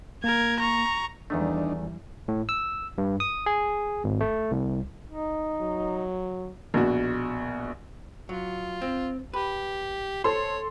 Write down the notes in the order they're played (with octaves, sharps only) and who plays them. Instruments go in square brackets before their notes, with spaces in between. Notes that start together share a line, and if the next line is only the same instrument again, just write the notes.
[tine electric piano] A#3 [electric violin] A#4 G#6
[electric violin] A#5 C#6
[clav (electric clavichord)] E2 D#3 A3 [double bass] E3 G3 [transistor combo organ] D4 D#4
[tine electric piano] A2
E6
G2
D#6
G#4
G#1
A3
C2
[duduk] D#4
[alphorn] F#3
[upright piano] A#1 B2 F#4
[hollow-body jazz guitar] F#3 [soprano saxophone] F4
[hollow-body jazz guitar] C4
[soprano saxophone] G4 [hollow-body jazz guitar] B4
[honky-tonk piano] A4 C6 [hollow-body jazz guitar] C5 [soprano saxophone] C#5